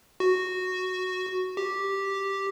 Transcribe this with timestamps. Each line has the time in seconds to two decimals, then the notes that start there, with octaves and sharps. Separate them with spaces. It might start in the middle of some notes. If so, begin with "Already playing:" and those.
0.20 F#4
1.57 G4